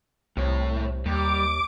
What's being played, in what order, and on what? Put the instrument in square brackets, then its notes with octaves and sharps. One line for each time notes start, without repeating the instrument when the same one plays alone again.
[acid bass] C2 [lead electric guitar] A2 C#5
[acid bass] D#2 [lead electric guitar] G3 [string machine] D6